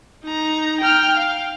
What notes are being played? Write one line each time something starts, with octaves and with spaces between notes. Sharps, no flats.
D#4 A#5
G5 F6
F5